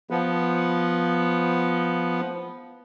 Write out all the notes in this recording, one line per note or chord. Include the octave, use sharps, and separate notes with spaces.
F3 B3